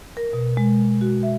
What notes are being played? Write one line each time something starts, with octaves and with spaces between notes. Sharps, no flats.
A#4
B2
G#3
F#4
E5